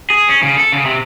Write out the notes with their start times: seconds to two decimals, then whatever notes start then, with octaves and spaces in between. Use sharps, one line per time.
0.10 G#4
0.29 C#4
0.43 C#3
0.57 A4
0.72 C#3
0.85 C3